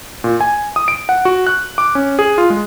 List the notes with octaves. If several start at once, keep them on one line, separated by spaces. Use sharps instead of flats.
A#2
G#5
D#6
D7
F#5
F#4
F#6
D6
C#4
G#4
F4
G#3